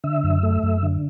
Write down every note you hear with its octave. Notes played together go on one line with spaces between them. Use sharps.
D3 E5
F#2
A3
F#2
D3